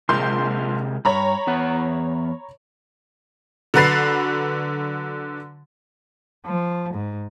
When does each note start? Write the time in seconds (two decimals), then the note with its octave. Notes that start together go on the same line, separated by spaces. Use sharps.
0.09 A#1 C3 G#3 A#4 C6 G6
1.05 G2 C#5 A#5 B5
1.47 E2 B3 F#5
3.74 D3 F#3 F#4 B4 A6 C7
6.45 F3
6.94 G#2